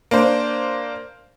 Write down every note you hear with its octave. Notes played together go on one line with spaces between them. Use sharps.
A#3 D4 C5